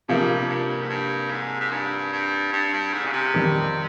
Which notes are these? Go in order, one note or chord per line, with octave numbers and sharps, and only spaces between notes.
G2 C3 F3 A#3
G2
G#2
G2
G#2
G#2
G2
G2
G2
G2
G#2
C#3
C3
F2 D#3 G3